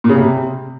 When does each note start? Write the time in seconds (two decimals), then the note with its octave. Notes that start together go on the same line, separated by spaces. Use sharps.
0.04 A#2
0.09 C#3
0.14 C3